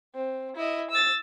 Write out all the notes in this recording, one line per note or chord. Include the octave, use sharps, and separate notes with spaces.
C4
E4 D#5
E6 A6